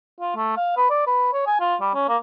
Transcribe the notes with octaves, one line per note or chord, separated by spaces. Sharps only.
F4
A3
F5
B4
D5
B4
C#5
G#5
F4
G3
C#4
A#3